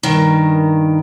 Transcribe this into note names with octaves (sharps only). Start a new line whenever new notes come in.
G2 D#3 A#4 A#5